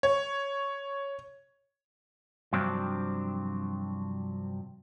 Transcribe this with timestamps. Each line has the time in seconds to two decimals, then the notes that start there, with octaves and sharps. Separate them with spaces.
0.03 C#5
2.53 G2 C3 F3 F#3 C4 D4